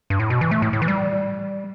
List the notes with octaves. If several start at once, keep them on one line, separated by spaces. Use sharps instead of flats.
G2
A2
B2
E3
A3
A2
A2
E3
G3